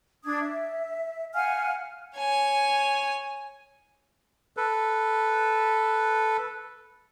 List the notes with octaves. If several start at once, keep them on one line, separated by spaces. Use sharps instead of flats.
D4 D#6 G#6
E5
F5 F#5 G#5 F6
C#5 G#5
A4 B4